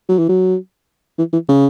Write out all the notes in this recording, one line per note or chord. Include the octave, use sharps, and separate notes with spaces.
F#3
E3
F#3
E3
E3
C#3